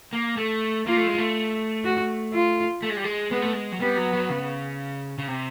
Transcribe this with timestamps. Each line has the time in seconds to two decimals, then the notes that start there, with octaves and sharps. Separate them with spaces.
0.13 A#3
0.37 A3
0.87 A#3 F4
0.97 A3
1.07 G#3
1.18 A3
1.85 F#4
2.33 F4
2.82 A3
2.90 G#3
2.97 G3
3.04 G#3
3.31 G#3 B3
3.42 A3
3.53 G#3
3.72 F#3
3.80 G3 B3
3.97 F#3
4.13 F#3
4.30 C#3
5.18 C#3
5.28 C3